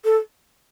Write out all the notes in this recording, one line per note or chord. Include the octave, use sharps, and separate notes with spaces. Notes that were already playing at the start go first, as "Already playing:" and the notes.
A4